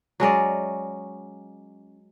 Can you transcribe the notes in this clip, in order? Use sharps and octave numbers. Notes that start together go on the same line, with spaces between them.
F#3 G#3 C#4 D5